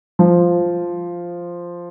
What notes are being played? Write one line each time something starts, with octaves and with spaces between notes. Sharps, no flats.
F3